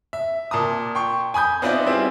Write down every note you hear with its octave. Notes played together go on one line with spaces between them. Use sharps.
E5
A#2 A5 A#5 D#6
G5 C6 C#6
G#5 B5 D#6 G6
B3 C4 D#4 F4 D5 E5
G3 C4 E4 G#4